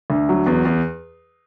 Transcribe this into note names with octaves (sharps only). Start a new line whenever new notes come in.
D2
F#3
E2
E2